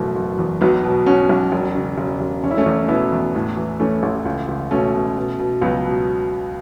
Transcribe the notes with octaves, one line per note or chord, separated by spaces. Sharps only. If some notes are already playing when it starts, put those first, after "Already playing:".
Already playing: F#1 B2 E3 A3
F#1
E2
B1 F#3 B3
B2
B2 C#4 F#4
B1
E1
C#3
E1
E1
E1 C#4
E4
A3 C#4
E2
B2 B3 E4
E2
A2
E3
E3 A3 C#4
A1
C#2
C#2
B2 A3 C#4
B2
B2
B2
C#2 F#3 B3
B2